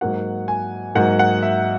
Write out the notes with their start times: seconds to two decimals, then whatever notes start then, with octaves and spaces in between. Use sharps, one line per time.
0.01 G#2 F#3 A#3 F#5
0.48 G#5
0.95 G#2 F#3 A#3 F#5
1.19 F#5
1.42 E5